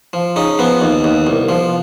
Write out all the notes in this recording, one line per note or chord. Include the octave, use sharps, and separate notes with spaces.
F3
C#3 D#4
F3 B3
D#2
D#2
C2
F3